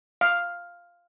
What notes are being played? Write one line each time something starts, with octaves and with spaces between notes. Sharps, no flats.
F5